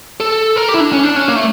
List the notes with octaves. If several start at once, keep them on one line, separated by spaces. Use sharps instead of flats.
A4
A#4
G4
E4
D4
C#4
D4
C#4
A#3
A3